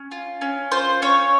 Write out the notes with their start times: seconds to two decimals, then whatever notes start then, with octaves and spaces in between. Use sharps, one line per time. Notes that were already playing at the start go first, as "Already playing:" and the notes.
Already playing: C#4
0.11 F4
0.41 C#4
0.72 F4 C5
1.02 C#4 C#5